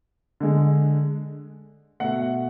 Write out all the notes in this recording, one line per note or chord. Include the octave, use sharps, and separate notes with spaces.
D3 G#3
B2 A3 F#5